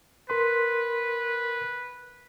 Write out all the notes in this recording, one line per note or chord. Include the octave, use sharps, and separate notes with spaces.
A#4 B4 C6